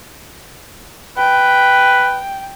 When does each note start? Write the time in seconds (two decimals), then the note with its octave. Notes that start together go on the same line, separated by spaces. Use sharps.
1.18 B4 G5